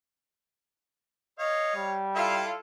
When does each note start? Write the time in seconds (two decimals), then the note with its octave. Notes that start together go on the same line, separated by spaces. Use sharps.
1.39 C#5 D#5 F5
1.76 G3
2.15 E4 F4 A4 E5 F5